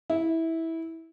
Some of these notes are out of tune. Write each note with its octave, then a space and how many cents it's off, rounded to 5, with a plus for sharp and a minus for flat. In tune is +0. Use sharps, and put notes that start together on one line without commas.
E4 -15